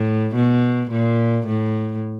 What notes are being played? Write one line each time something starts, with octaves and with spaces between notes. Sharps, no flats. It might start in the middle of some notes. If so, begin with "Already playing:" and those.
Already playing: A2
B2
A#2
A2